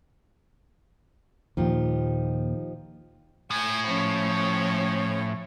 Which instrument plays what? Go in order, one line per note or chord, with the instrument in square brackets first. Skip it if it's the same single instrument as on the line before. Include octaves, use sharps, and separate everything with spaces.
[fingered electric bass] D#2 A#2 [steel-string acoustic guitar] F3 D#4 G4
[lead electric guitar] A2 [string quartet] G#5
[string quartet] F3 C#4 C#5